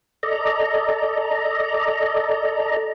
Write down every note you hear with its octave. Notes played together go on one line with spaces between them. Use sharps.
A4 D5 D#5 A#5